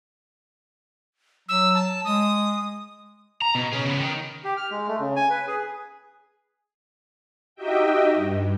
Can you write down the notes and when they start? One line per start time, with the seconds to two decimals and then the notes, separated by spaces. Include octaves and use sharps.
1.49 F#3 E6
1.74 A5
2.05 G#3 D#6
3.42 A#5
3.55 B2
3.73 C#4 G#4
3.85 C#3 B3
3.99 D#3
4.44 G4
4.57 F6
4.71 G#3
4.88 A3
5.00 C#3
5.16 G#5
5.30 B4
5.47 G#4
7.55 D#4 F#4 G4 D#5 E5 G5
8.15 G2